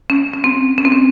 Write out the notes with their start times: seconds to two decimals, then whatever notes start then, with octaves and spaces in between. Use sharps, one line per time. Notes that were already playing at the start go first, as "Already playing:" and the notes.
0.10 C#4
0.33 C#4
0.44 C4
0.78 C#4
0.85 C4
0.92 C#4